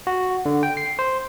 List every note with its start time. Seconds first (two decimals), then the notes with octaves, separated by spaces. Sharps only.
0.07 F#4
0.46 D3
0.63 G5
0.77 C7
0.99 C5